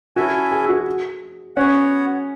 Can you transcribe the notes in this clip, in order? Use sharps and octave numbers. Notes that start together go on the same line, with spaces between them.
C#4 E4 F#4 A4 E5 G#5
G#4
F#4
B3 C#4 F#4 C#5 F#5